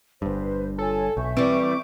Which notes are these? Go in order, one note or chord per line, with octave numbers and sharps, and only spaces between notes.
G1 G2 B4 C5
F4 A4 C#5 G#5
B1 E5 C#6 G6
E3 G3 C4 D6